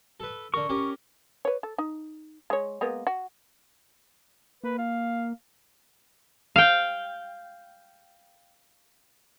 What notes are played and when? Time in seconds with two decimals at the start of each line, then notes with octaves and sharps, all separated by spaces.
0.20 A4 B4
0.54 D3 A#4 C#6
0.69 C#4 G4 A#4
1.45 B4 C#5
1.63 A4
1.78 D#4
2.50 G#3 C#5
2.81 G#3 A#3 B3
3.07 F#4
4.63 A#3 B4
4.78 F5
6.56 F5 G5